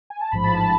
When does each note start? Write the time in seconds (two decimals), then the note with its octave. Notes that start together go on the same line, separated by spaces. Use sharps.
0.10 G#5
0.21 A5
0.32 A1 G#2 F3 B5
0.44 A5
0.56 A5